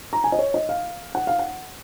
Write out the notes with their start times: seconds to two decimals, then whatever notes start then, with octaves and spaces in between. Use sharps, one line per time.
0.13 A#5
0.24 G#5
0.32 D#5
0.39 C#5
0.54 D#5
0.69 F5
1.15 F#5
1.27 F5
1.39 F#5